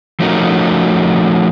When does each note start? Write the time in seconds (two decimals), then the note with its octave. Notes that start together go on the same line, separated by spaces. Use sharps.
0.20 F3 A3 C#4 D#4 F#4 A#4